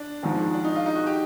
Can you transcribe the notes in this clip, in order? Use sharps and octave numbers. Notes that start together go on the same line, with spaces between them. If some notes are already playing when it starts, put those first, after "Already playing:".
Already playing: D4
G#1 G#2 F3
D4
D#4
F4
D#4
F#4
G4